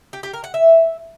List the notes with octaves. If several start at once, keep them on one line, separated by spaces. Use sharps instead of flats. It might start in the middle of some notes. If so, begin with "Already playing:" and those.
G4
G4
A#4
F#5
E5